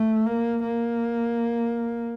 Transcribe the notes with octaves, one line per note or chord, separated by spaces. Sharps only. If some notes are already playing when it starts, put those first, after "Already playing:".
Already playing: A3
A#3
A#3